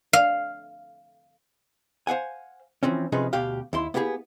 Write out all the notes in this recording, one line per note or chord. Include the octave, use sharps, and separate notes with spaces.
F5
C5 F5 F#5 G#5
E3 F3 C4 C#4
C3 F3 C#4 D#4 G#4 B4
D2 B2 G4 F5
D#2 E4 C6
A#3 B3 E4 G4 G#4